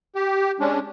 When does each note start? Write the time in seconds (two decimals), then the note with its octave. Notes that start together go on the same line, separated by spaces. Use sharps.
0.15 G4
0.60 G#3 C#4 D4